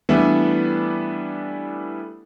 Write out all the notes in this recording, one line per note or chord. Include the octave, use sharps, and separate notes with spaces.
E3 G3 A3 B3 D4 E4